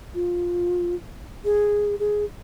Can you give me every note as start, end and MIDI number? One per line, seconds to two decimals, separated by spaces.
0.15 0.95 65
1.45 1.95 68
1.99 2.25 68